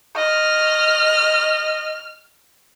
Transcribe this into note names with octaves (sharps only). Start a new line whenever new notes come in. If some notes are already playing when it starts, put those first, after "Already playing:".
D#5 F6